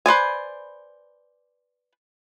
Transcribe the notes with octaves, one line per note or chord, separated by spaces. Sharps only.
B4 C5 D5 G#5